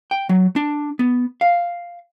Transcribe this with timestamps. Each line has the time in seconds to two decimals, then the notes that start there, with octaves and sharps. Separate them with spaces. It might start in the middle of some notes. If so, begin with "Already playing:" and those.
0.11 G5
0.29 F#3
0.56 D4
0.99 B3
1.41 F5